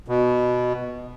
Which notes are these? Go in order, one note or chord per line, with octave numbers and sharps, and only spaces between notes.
B2